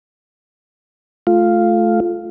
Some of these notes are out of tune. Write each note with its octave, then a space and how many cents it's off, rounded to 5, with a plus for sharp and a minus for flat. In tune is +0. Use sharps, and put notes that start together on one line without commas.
A3 -20 F4 +0